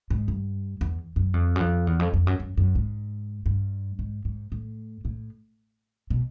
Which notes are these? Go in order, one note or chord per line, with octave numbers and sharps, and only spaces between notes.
G#2
G2
E2
F#2
F2
F#2
F2
E2
F2
F2
F#2
F#2
F#2
G#2
G2
G#2
G#2
A2
A2
B2